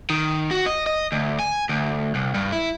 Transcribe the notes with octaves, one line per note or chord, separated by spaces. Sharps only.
D#3
F#4
D#5
D#5
D2
G#5
D2
C2
G2
E4